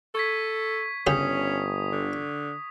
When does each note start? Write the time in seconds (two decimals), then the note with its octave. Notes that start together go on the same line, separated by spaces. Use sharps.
0.15 A4 C#6 G#6 B6
1.07 G1 C#3 C#4 G4 G#4 D#6
1.92 D3